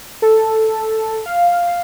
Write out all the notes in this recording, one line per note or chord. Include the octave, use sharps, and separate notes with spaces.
A4
F5